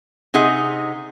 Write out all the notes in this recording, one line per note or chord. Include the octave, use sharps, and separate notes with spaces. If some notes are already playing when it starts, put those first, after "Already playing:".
C3 D#4 G#4 F#5